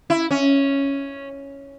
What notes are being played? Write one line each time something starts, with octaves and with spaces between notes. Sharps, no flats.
E4
C#4